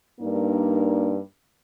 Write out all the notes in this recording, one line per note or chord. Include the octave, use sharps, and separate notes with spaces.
G2 A#3 D4 D#4 A#4